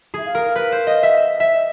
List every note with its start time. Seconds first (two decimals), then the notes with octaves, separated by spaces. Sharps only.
0.14 G#4 E5
0.25 F5
0.35 A#4
0.55 B4
0.72 C5
0.87 D#5
1.03 E5
1.19 D#5
1.40 E5
1.51 D#5